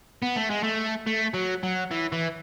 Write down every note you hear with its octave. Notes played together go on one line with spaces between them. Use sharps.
B3
A3
G#3
A3
A3
F#3
F#3
E3
E3